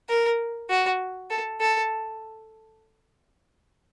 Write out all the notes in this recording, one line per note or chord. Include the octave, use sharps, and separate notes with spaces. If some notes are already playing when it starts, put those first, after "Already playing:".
A#4
F#4
A4
A4